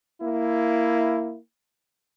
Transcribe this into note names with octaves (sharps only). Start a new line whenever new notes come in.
A#3 E4